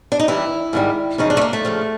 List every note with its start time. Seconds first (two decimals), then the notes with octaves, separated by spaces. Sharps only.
0.12 D4
0.20 D#4
0.28 G2 E3 G3 E4
0.73 G#2 D#3 G3
1.18 F#2 C#3 F3 D#4
1.30 D4
1.37 A3
1.41 A#3
1.53 A3
1.65 D2 C#3 F3